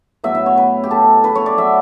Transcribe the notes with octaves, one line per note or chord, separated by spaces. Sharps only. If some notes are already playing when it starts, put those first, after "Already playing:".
A2 F#3 B3 E5
E5
C#5
B4
G4
A4
B4
C#5
D5
F#3 A3 E5